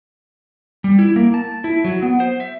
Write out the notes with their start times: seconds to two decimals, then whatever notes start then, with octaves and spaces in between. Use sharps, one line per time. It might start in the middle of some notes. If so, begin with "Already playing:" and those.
0.84 G3
0.99 E4
1.16 A#3
1.34 A5
1.64 E4
1.84 F#3
2.02 B3
2.20 C5
2.40 E5